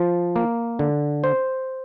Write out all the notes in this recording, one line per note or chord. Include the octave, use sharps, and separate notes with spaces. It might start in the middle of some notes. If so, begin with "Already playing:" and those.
Already playing: F3
A#3
D3
C5